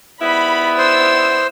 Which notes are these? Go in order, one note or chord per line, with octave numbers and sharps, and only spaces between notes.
G#2 G3 B3 E4 B5
C5 E6